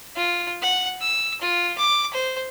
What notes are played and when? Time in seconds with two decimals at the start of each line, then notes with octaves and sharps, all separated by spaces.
0.16 F4
0.62 F#5
1.01 E6
1.41 F4
1.78 D6
2.13 C5